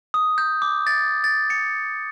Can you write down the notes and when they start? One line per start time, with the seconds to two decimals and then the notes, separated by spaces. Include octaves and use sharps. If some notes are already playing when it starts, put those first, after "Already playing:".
0.14 D#6
0.38 G6
0.62 D6
0.87 A6
1.24 A6
1.50 C#7